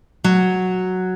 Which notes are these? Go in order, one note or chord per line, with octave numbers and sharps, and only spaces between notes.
F#3